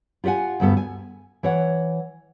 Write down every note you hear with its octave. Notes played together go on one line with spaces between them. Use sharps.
F4 G4 D5 F#5 G#5
D2 G2 B3 A4
G#5
E3 C#5 F#5